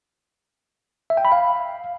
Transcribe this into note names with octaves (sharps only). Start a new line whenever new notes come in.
E5
G5
B5
F5